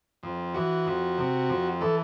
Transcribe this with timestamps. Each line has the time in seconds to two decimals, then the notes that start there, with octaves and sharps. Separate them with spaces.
0.23 F2
0.54 E3 F#4
0.86 F2
1.18 C3
1.49 F2
1.81 E3 A4